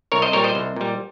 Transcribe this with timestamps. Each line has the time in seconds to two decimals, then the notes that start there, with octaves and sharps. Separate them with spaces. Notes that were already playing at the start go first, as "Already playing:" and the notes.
0.12 C2 A#4 C#5
0.22 C5 D#5
0.33 A#2 G3 A#4 C#5
0.44 C5 D#5
0.55 C2
0.76 A#2 G3